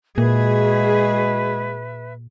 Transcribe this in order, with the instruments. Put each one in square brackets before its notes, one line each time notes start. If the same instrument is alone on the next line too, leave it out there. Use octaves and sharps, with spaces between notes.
[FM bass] A#2 [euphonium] G#3 [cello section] F#4 G#4 [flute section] B4 E5